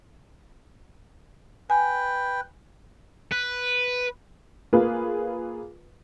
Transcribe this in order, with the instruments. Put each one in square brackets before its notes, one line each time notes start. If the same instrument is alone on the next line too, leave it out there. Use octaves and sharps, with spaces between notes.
[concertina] B4 G5 [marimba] G#5
[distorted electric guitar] B4
[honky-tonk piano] A#3 F4 G#4 B4